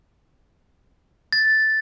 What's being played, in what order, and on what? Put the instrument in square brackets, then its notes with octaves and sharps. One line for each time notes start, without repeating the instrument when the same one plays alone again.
[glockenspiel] A6